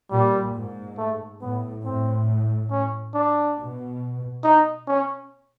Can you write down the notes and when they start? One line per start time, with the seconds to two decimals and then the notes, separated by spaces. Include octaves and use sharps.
0.11 A#2 G3
0.55 G#2
0.98 A3
1.42 A2 B3
1.84 A2 C4
2.71 C#4
3.14 D4
3.57 B2
4.43 D#4
4.87 C#4